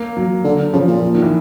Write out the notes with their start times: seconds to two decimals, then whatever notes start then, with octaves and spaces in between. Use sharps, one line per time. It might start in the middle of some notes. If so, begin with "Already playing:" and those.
Already playing: A#3
0.17 F#3
0.44 D3
0.73 C#3 F3
0.88 A#2
1.15 D#3
1.22 E3